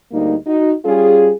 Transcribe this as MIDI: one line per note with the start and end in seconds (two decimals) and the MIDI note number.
0.12 0.35 38
0.12 0.35 55
0.12 0.35 58
0.12 0.35 63
0.47 0.73 63
0.47 0.73 66
0.85 1.31 55
0.85 1.31 61
0.85 1.31 65
0.85 1.31 68